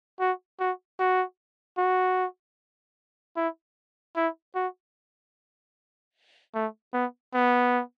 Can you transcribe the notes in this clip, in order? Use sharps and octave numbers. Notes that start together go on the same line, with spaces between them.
F#4
F#4
F#4
F#4
E4
E4
F#4
A3
B3
B3